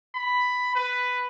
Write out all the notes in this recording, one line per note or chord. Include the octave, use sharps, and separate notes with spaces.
B5
B4